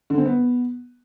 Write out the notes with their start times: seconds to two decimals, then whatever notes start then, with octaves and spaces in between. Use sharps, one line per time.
0.10 D3
0.18 C4
0.26 B3